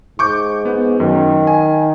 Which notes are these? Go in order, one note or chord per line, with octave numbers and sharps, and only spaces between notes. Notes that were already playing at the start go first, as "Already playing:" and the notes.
G#2 C#6 D6 G6
B3
F#2 D#3
G#5